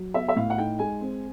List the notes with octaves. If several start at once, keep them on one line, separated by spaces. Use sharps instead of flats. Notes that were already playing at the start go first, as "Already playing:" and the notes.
Already playing: F#3
B3 E5
E5
A2 F5
F#5
D#4 G5
G#3 G#5
C4